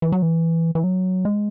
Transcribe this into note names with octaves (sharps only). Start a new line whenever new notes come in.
E3
F#3
E3
E3
F#3
G#3